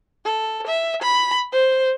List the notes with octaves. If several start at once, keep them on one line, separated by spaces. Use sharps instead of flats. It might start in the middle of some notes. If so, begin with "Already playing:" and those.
A4
E5
B5
C5